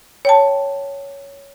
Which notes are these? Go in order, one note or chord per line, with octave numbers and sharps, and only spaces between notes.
C#5 G5 A5